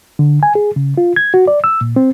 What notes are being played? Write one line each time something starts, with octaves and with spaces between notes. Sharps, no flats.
D3
G#5
G#4
C#3
F4
G#6
F#4
D5
E6
A#2
C4